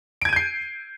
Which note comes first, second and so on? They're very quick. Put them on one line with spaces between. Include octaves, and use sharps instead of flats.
D7 G#6 D#7 G6 C7